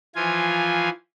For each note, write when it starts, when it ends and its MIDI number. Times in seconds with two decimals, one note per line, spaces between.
0.15 0.89 52
0.15 0.89 53
0.15 0.89 65
0.15 0.89 80